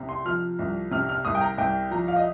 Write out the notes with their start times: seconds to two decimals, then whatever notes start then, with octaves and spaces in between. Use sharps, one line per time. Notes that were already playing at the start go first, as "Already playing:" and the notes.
Already playing: C2 C3
0.09 C6
0.25 F3 F6
0.59 C2
0.91 C3 F6
1.09 F6
1.25 C2 D#6
1.35 G5
1.41 A#5
1.58 C2 G5
1.91 F3 A#5
2.08 F5
2.16 D#5